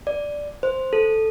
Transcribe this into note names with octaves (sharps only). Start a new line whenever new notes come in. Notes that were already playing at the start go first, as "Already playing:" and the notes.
D5
C5
A4